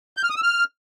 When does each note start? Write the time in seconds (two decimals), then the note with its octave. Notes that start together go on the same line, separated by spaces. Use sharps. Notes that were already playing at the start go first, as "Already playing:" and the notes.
0.17 G6
0.23 F6
0.30 D#6
0.36 E6
0.43 F6